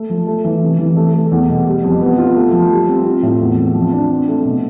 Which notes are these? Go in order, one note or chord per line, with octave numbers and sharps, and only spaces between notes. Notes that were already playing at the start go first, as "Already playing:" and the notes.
Already playing: A3
F3
A3
E3
C3
E3
A3
A3
E2
B2
G3
F2
B3
F4
A3
F3
G3
C4
F4
A2
E2
C4
F3
D4
C4
A3
B2